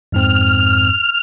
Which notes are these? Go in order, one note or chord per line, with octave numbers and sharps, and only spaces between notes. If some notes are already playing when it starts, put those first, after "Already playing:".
F2 G#2 C4 F6